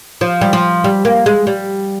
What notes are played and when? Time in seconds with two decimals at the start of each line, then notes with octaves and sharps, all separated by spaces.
0.21 F3
0.41 G3
0.53 F3
0.84 G3
1.05 A#3
1.26 G#3
1.47 G3